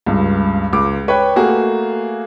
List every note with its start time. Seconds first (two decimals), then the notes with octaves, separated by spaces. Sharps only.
0.06 C#2 G2
0.73 C#2 D6
1.08 B4 C#5 G5 C#6
1.36 A3 A#3 F#4 G#4